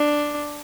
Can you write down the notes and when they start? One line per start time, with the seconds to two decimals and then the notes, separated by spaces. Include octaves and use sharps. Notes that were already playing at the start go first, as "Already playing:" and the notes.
Already playing: D4